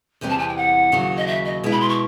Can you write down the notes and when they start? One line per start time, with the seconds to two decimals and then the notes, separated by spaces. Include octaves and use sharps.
0.21 E2 C3 E3 G3 C4
0.30 A5
0.39 G#5
0.48 G5
0.57 F#5
0.92 D#2 C#3 F#3
1.17 D#5
1.27 E5
1.45 D#5
1.64 B2 G#3 B3 E4
1.72 B5
1.80 C6
1.89 C#6